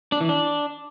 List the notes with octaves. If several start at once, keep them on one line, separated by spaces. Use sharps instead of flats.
D4
E3
D4